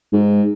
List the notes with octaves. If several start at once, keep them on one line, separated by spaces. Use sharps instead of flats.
G#2